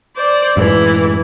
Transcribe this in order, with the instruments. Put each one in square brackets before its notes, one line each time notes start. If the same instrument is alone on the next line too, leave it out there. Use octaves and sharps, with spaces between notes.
[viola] C5 D5
[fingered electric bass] F#2 A2 G#3 [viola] E3